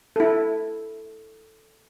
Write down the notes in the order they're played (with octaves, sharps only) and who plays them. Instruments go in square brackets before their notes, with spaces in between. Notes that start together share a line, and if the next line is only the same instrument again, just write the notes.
[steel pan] E4 A4